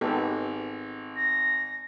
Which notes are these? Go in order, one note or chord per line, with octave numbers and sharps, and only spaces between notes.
G#1 B3 G4 A4
A#6